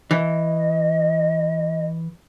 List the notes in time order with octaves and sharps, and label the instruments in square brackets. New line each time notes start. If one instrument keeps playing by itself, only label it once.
[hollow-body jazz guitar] E3 [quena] D#5